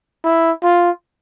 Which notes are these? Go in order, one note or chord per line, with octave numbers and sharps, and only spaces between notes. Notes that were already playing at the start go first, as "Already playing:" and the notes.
E4
F4